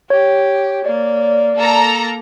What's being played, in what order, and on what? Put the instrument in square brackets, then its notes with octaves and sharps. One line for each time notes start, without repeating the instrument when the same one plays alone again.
[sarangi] G4 [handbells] C#5
[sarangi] A#3 [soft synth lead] D5
[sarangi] A#3 [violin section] A4 A#5